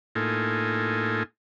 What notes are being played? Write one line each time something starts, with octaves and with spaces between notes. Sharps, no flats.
A2 A#3 D#4 F4 A4 G#5